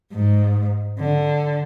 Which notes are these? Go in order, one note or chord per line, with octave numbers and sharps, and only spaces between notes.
G#2
D3